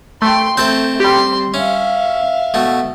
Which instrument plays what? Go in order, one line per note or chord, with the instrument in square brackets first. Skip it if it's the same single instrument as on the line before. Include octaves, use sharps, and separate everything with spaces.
[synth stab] A3 [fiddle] G5 C6
[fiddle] A3 [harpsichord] C4 A4 [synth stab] G6
[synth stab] G3 G4 [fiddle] C6
[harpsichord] C#4 [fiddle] E5 F5
[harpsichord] B2 A3